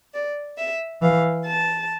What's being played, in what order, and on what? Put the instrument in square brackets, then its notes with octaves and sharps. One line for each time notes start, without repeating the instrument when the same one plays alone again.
[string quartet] D5
E5
[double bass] E3 [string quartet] F5
[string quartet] A5